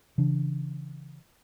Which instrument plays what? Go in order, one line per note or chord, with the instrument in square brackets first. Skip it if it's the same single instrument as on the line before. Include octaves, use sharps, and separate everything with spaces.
[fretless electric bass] C#3 E3 D4